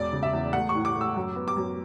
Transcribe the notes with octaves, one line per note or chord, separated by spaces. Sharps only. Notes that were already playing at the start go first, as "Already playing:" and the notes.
Already playing: E1 D5
C#3
E5
E2
A3 F#5
C#6
A2
D6
A3
E6
F#2
B3
D6
F#2